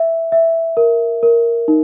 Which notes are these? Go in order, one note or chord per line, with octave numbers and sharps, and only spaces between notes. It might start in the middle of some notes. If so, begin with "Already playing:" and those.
Already playing: E5
E5
A#4
A#4
D#4